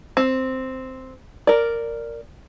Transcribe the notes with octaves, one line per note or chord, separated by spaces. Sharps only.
C4
A#4 D5